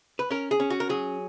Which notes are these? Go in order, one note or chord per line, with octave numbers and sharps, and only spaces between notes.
B4
C#4 A#4
G#4
C#4
F#4
A#4
F#3 G#4